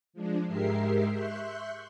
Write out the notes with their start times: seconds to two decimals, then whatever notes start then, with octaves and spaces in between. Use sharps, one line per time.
0.13 F3 G#3 D4
0.47 G#2 G#3 G4 A#4 E5 C7
1.11 E5 C6 C#6 F#6 G6